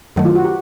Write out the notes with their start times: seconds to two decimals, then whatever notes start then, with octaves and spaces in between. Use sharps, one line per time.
0.16 F#2 D#3 F#3 A3
0.25 F4
0.35 F#4
0.44 G4